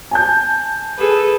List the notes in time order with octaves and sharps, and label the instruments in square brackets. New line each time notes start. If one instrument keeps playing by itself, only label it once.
[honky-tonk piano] G#5 A5 G6
[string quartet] G#4 A4 B4